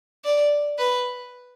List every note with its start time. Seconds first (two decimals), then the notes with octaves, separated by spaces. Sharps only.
0.25 D5
0.78 B4